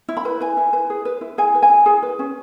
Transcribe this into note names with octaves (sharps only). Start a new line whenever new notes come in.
E4
B5
B4
B4 G#5
E4
B4
G#4
B4
E4
G#4 G#5
B4
G#5
E4
G#4
B4
C#4